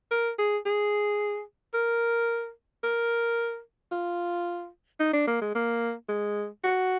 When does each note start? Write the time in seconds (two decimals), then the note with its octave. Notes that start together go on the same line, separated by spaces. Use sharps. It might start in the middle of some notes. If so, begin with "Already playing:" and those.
0.11 A#4
0.38 G#4
0.65 G#4
1.74 A#4
2.83 A#4
3.92 F4
5.00 D#4
5.13 D4
5.27 A#3
5.42 G#3
5.55 A#3
6.09 G#3
6.64 F#4